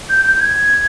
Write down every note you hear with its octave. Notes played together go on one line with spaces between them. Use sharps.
G6
G6
G#6